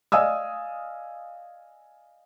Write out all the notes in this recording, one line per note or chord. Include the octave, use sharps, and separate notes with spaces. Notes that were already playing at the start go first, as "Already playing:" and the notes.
D5 D#5 F5 G#5 D#6 E6